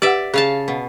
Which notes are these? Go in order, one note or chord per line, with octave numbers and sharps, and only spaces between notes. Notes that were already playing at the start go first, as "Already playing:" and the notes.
G4 B4 D5 E5 F#5
C#3 G#4 F5 A5
B2